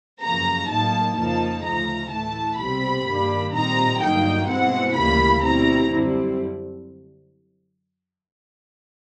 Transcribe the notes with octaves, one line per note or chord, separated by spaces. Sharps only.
F#2 C#3 F3 A#3 A#5
A2 F#3 A#3 D#4 A5
F2 C#3 F3 A#3 D#4 A5
D2 C#3 F3 A3 A#5
A2 E3 A3 A5
C2 B2 G3 C4 B5
G2 D#3 G3 A#3 D4
A#2 G3 C4 D#4 A#5
G2 D3 F#3 A#3 D#4 G5
B2 G#3 C4 E4 F#5
D2 C#3 E3 G3 A#3 B5
B2 G3 C4 E4 A#5
F#2 D3 G3 C4 E4